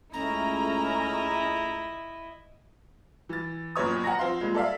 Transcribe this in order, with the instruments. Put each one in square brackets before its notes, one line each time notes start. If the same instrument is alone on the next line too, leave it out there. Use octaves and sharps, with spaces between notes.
[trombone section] C#2 A3 [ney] C#4 [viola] E4 D#5 [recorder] A#5
[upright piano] E3 A6
G1 F#2 A#2 C#5 D#6
F#5 G#5 A#5 A#6
F3 C4 F5 C6
A#2 G3 G#3
A4 D5 E5 F5